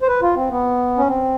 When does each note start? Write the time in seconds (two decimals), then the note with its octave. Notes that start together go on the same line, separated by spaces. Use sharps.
0.02 C5
0.08 B4
0.22 F4
0.36 C4
0.50 B3
0.98 C#4
1.08 C4